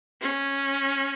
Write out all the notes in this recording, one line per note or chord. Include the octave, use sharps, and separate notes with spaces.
C#4